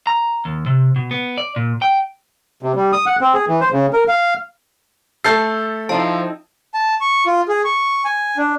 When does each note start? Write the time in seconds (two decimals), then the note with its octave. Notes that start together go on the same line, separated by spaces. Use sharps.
0.07 A#5
0.45 D#2
0.66 C3
0.96 B2
1.11 B3
1.38 D5
1.56 A#2
1.82 G5
2.63 C3
2.75 G3
2.92 D#6
3.06 F#5
3.21 C4
3.34 G#4
3.48 E3
3.61 C5
3.72 C#3
3.93 A#4
4.08 F5
5.24 A3 A4 E6 G6 C7
5.89 F3 C4 D#4 E4 A5
6.74 A5
7.01 C#6
7.26 F4
7.49 G#4
7.65 C#6
8.05 G#5
8.37 D4